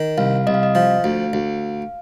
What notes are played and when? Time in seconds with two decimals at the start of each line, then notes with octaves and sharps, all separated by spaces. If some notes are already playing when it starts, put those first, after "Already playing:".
Already playing: D#3
0.18 C2 F5
0.47 C2 D#5
0.54 F5
0.63 D#5
0.75 F3 F5
1.04 D2
1.33 D2